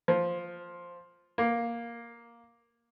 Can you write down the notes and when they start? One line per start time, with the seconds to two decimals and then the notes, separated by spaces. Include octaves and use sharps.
0.08 F3
1.38 A#3